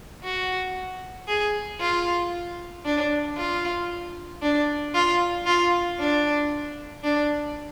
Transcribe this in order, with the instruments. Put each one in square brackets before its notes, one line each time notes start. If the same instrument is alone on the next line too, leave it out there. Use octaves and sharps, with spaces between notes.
[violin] F#4
G#4
F4
D4
F4
D4
F4
F4
D4
D4